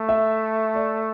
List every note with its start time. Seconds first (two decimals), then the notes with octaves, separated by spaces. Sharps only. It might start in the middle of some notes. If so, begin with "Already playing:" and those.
Already playing: A3
0.09 E5
0.75 D5